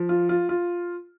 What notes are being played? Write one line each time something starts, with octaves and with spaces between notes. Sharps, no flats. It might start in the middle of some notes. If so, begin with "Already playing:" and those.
Already playing: F3
F4
F4
F4